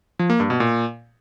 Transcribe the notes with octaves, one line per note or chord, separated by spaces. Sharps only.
F3
A#3
G2
B2
A#2